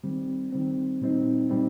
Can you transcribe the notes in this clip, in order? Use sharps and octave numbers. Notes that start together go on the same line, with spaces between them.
D#3 G3 C4
D#3 G3 C4
A#2 G3 C4 D#4
A#2 G3 C4 D#4